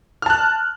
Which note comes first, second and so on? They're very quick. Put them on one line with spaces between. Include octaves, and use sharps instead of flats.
F6 A5 F#6